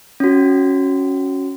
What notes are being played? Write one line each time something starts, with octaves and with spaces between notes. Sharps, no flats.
C#4 F#4